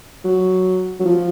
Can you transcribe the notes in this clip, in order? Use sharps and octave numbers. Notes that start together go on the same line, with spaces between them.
F#3
F#3
F3